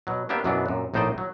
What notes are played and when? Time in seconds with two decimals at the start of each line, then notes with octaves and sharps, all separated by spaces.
0.07 B2 F#3
0.29 A#3 B3 D4 G4 E5 F5
0.44 F#2 B2 E3 F#3 B3 D4
0.66 F#2 A#2
0.94 A#1 A2 D#4 C5 D5 D#5
1.18 F#3